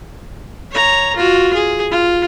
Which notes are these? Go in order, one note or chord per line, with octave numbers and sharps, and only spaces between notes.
C#5 A#5
F4 F#4
G#4
F4